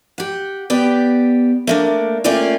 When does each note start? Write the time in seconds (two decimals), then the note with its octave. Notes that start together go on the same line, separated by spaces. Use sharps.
0.18 G4 F#5
0.70 B3 G4 D5 G5
1.67 A3 A#3 D4
2.24 A3 A#3 C#4 F4 D5 G5